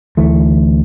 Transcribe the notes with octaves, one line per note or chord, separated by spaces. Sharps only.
D2 E3 A3